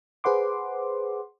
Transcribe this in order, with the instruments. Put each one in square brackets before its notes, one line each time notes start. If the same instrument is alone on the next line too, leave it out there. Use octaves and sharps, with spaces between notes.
[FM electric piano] G#4 B4 C5 F#5 C6 D6